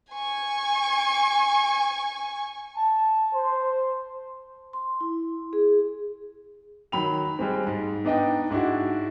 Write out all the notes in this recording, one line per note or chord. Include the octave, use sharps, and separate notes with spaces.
G#5 C#6
A5
C5
C6
E4
G#4
D#3 F#3 B5 F7
G3 G#3 C4
G#2
B3 D4 D#4 D#5 G5
G#2 D4 E4 F#4